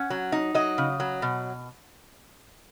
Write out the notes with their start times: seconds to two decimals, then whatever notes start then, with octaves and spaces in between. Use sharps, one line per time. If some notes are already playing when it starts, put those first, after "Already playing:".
Already playing: C#4 F#5
0.10 F#3
0.32 D#4
0.54 F#3 D#5
0.78 C#3
1.00 F#3
1.22 B2